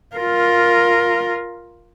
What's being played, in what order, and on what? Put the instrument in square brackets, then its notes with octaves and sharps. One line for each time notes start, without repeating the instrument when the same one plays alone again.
[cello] F4 A#4